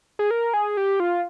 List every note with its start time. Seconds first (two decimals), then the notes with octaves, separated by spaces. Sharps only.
0.19 G#4
0.31 A#4
0.54 G#4
0.77 G4
1.00 F4